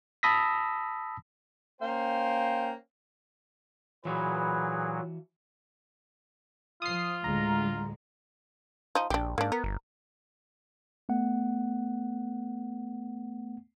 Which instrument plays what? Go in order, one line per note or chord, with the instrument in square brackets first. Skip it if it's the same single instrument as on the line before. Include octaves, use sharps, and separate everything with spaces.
[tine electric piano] A5 B5 D#6 E6 A#6 B6
[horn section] A#3 C#4 C5 F5 G5
[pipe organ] A#2 F#3 [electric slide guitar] E3 F#4 [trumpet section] G#4 B4
[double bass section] F3 [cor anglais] F4 [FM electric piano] D#6 C7
[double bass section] D2 A2 D3 [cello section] G#3 [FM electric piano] A#5
[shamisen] F3 D#4
[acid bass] A#1 [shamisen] D4 G4
[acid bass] G#2 [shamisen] A#3 D4
[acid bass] B3 [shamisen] A#4
[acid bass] G1
[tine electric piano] A3 B3 F#5